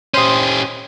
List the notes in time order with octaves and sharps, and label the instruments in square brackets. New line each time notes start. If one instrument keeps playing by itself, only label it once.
[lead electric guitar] C#4 G4 [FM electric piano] C5 C6 D#6